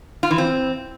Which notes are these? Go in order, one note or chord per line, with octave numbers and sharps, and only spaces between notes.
F4
E3
C4